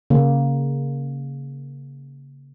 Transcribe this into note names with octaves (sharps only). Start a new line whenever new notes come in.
C#3 A#3